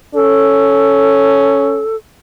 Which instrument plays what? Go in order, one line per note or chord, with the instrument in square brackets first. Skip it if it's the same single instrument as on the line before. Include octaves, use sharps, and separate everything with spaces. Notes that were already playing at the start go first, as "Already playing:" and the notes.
[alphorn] C#4 [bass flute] A4